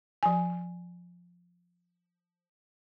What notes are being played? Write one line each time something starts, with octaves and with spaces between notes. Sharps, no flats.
F3 G#5